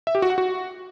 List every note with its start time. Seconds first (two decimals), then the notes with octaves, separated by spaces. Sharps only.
0.07 E5
0.15 G4
0.22 F#4
0.30 F#5
0.38 F#4